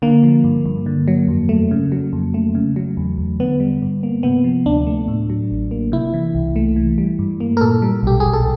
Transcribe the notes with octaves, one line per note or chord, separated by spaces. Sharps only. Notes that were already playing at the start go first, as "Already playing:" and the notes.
D3 A#3
F3
G2
G2
D3
F#3
F2
A3
C#3
F#3
F2
A3
C#3
F#3
E2
E2
D3 B3
G3
G2
A#3
C3 B3
F3
D2 D4
A3
A2
F#3
A1
A#3
C3 E4
E3
C2
A3
E3
G3
G2
A#3
A#4
A#2 A4
G3
B1 G4
B1 G#4
A4